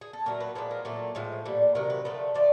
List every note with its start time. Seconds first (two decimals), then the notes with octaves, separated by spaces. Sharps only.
0.01 G#4
0.13 A4
0.26 A#2 F#3 A3 A#4
0.40 B4
0.55 A#2 F3 G#3 B4
0.71 A#4
0.85 A#2 F#3 A3 A4
1.15 A2 F3 G#3
1.45 A#2 G3
1.75 C3 D#3 F#3 A#4
1.90 B4
2.05 D3 F3 A3 B4
2.34 D3 F3 A3 D5